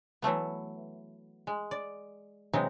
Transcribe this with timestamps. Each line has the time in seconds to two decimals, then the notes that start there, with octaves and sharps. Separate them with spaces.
0.22 E3 F#3 A3 B3
1.47 G#3
1.71 D5
2.54 C3 E3 F#3 G#3 D#4